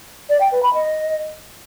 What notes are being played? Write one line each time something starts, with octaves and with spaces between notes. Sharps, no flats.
D5
G5
B4
B5
D#5